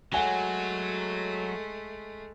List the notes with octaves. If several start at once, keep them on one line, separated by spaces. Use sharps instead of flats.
F#3 G#3 A3 F#5 G#5 G7